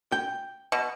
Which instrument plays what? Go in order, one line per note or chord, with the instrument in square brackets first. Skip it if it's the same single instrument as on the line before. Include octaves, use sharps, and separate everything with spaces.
[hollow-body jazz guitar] G5
[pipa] B2